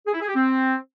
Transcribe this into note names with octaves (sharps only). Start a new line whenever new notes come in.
G#4
E4
G#4
G4
C4